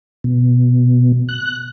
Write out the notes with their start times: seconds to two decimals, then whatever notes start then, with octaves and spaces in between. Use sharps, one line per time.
0.24 B2
1.29 F#6